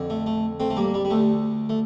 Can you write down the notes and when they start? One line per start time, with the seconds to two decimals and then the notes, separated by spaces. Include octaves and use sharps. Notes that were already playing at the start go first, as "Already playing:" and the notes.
Already playing: F2 D3
0.10 A3
0.26 A3
0.60 A3 C4
0.70 A3
0.76 G3 A#3
0.94 G3
1.05 G3
1.10 D2 D3 A3
1.69 A3